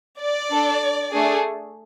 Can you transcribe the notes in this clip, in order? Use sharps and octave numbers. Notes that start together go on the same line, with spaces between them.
D5
D4 A4
A3 D4 G#4